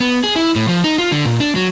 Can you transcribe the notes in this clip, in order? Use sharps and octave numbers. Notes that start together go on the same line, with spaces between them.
B3
G#4
E4
A2
F3
D#4
F4
D3
A#2
D4
F#3